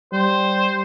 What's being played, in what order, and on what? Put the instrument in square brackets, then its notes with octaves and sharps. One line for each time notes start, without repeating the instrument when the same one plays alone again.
[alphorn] G3 [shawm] C5